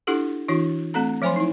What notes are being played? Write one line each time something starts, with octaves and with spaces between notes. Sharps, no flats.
D4 E4 F4 G4 A4 F#5
E3 D4 E4 F#4
A3 C4 A4 A#5
F3 F#3 C5 G#5 B5 C6
D#4 E4